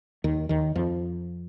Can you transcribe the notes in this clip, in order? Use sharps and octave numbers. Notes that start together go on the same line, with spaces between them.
D#2 D#3
D#2 D#3
F2 F3